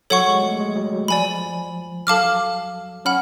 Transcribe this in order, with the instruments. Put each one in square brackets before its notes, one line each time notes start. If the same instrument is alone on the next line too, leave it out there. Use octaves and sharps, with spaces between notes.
[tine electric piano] F#3 [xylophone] A4 C#5 F#5 C#6
[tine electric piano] G#3
A3
G#3
F#3
F#3
[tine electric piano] F3 [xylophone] D5 G#5 B5
[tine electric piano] F#3 [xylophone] A4 F5 A5 D6 F6
[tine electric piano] C#4 [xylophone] F#5 B5 F6